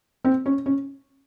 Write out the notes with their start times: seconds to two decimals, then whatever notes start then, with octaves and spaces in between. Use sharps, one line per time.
0.24 C4
0.46 C#4
0.66 C#4